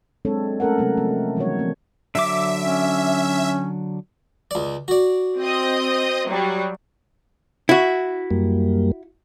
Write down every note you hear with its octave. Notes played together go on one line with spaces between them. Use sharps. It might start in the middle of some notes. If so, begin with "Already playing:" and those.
F#3 G#3 C4 D4 A4 C#5
A3 C#4 A4 A#4 F#5
C3 F#3 G#3 A3 B3 C4
F3 A3 B3 C4
D#3 E3 F#3 G3 F#4 C#5
F3 A#3 C4
D3 F#3 E5 D6
C#4
C#2 D5
F#4 D5
C4 D#5
F#3 G3
E4 F#4
F#2 G3 A#3